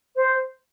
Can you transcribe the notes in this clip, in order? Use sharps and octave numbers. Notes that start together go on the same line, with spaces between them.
C5